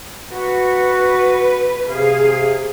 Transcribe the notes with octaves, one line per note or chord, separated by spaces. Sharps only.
F#4 B4
C3 G#4 F5